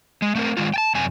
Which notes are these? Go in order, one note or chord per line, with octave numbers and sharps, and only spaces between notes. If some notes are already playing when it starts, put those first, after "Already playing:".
G#3
A3 C4 A#4
D#3 G#3 F4
G5 A5
F#2 C3 G#5